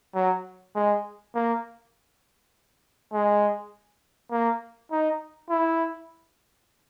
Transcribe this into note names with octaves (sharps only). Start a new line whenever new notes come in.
F#3
G#3
A#3
G#3
A#3
D#4
E4